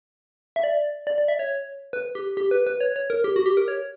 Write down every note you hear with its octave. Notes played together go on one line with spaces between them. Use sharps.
E5
D5
D5
D5
E5
C#5
B4
G4
G4
B4
B4
C#5
C#5
A#4
G4
F#4
G4
A#4
C#5